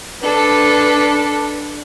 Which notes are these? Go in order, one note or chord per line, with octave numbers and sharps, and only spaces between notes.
D4 A4 B4